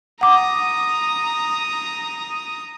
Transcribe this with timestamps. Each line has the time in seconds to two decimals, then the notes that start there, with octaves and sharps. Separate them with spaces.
0.21 F#5 A#5 D6 D#6